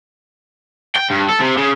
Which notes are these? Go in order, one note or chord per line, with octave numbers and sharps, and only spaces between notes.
G5
G2
A4
C3
C#3